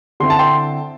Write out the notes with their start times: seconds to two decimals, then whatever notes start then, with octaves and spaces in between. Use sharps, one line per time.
0.20 D3 C4 E4 C6
0.30 A5
0.39 G5 C6